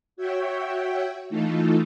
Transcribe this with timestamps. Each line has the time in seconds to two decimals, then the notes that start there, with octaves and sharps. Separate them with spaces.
0.17 F#4 C#5 E5 G5
1.30 E3 A3 D#4 F4 A4